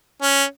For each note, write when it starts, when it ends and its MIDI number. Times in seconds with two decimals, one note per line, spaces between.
0.22 0.44 61